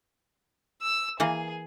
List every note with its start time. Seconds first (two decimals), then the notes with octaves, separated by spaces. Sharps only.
0.82 E6
1.20 E3 A#3 G#4